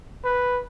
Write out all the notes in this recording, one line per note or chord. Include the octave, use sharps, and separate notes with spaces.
B4